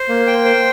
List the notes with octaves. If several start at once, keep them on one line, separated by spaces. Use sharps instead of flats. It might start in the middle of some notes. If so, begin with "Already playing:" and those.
Already playing: C5
A#3
G5
C5